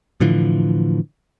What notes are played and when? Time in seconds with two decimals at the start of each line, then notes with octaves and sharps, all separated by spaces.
0.20 A2 D3 E3 F3